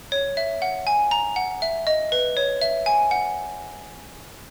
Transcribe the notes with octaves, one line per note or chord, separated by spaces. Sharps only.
C#5
E5
F#5
G#5
A#5
F#5
E5
D#5
B4
C#5
E5
G#5
F#5